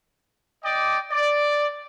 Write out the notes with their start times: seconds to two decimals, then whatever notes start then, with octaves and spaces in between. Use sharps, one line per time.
0.64 D5 D#5 G5 D6
1.11 D5